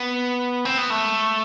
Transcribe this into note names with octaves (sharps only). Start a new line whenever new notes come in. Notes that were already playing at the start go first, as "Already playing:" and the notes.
Already playing: B3
C4
B3
A3